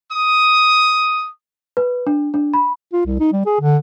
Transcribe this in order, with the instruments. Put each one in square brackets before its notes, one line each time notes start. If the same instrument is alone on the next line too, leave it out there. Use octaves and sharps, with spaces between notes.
[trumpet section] D#6
[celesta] B4
D4
D4
B5
[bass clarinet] F4
C2
D#4
G3
G#4
D3